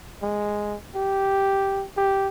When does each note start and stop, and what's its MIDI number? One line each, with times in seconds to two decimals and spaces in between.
0.22 0.77 56
0.95 1.85 67
1.97 2.28 67